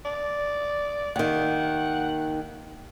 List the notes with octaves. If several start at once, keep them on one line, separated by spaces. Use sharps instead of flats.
D5
D#2 D#3 F#5